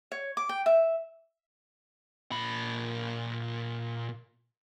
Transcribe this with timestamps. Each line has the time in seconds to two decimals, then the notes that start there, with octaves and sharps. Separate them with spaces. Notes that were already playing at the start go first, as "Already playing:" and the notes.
0.12 C#5
0.37 D6
0.49 G5
0.66 E5
2.31 A#2 B5